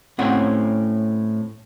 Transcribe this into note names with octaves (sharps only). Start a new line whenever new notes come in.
A2 C4 C#4 F#5